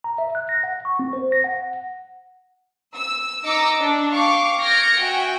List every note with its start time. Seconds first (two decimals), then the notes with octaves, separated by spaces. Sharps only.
0.04 A#5
0.18 E5
0.35 F#6
0.49 A#6
0.63 F#5
0.85 C#6
0.99 C4
1.13 C5
1.32 A#6
1.44 F#5
2.96 E6
3.45 D#4 D#5 A#5 D6 E6 C#7
3.82 D4
4.12 F5 G5 C#6 D6
4.61 F6 G6 G#6 A#6 C#7 D7
5.00 F#4 E5 G5 G#5